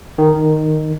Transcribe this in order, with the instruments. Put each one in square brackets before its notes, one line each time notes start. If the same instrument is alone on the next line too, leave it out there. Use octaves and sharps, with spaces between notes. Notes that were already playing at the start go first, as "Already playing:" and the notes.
[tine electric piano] D#3